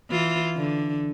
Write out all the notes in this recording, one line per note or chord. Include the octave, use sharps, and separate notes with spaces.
E3 F4
D3